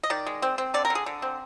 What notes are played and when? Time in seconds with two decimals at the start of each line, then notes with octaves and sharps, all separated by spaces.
0.03 D#5
0.10 D#3 D5
0.26 G#3
0.42 C4
0.58 C4
0.74 D3 D5
0.85 A#4
0.90 D3
0.95 G#4
1.06 D3
1.22 C4